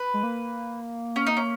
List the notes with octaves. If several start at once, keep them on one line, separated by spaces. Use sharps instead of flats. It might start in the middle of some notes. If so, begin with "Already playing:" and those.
Already playing: B4
G#3
A#3
C#4
D#4
C#4